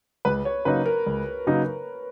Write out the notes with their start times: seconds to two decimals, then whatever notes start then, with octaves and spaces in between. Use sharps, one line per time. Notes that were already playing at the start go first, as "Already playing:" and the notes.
0.25 C#2 B4
0.45 C#5
0.65 C#3 F#3 A#3 D#4 B4
0.86 A#4
1.06 C#2
1.47 C#3 F#3 A#3 D#4